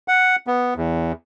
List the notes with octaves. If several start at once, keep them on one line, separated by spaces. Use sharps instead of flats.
F#5
B3
E2